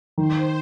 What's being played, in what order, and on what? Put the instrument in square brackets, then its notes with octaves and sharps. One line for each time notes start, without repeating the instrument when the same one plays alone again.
[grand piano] D#3 [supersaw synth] C5